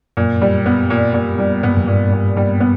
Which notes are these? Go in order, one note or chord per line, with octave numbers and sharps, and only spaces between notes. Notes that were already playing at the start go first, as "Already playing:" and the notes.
F#2 A#2
G3
B3
A#2
A#2
G3
G#2 B3
G2
F#2
G2 A#2
A#2
G3
B3